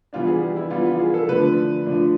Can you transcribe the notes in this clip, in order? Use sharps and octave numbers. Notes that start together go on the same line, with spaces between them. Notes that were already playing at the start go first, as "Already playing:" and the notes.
E3 G3 B3 D4 F4
G#4
G4
E4
E3 G3 B3 D4 F4
F4
G#4
A4
D3 F3 A3 D4 B4
D3 F3 A3 D4